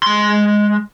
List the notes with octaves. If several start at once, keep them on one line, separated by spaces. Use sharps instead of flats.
G#3 C6